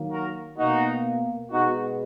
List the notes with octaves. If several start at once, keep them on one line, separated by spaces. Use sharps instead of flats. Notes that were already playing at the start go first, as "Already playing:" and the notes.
Already playing: D#3 F#3 A#3
F#4 A#4
B2 A#3 D#4 F#4
B2 G#3 B3 D#4 F#4